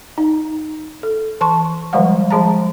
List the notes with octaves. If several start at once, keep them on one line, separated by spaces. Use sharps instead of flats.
D#4
A4
E3 A5 C6 C#6
D#3 F3 G3 G#3 F5 F#5
F3 G#3 G#4 A5 A#5